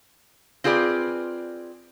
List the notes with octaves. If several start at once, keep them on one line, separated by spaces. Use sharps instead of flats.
C4 F4 G#4 B4 D5